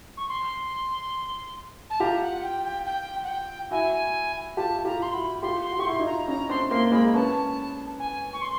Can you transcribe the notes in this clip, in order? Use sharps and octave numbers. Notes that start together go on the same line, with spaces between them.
C#6
C6
A5
F4 G4 A#5
F#5
G5
G5
G5
F#5
G5
E4 F#4 G#5
F4 G4 A5
F4 G4 A#5
C6
E4 F#4 B5
F4 G4 C6
C6
F#4
G4 C#6
E4 F#4 C6
D#4 F4
A#5
C#4 D#4 A#5
C4 D4 C6
A#3 C4 C6
G#3 A#3 B5
B3 C#4 A5
G#5
C#6
C6